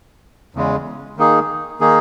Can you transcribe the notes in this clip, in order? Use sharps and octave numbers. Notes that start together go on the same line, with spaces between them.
E2 C#3 G#3
D#3 A#3 D#4 G#4
D#3 A#3 D#4 G#4